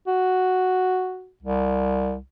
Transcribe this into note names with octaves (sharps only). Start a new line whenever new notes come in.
F#4
C2